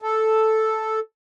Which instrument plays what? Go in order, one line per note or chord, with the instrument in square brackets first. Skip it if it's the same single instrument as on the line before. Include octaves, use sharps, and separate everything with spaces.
[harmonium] A4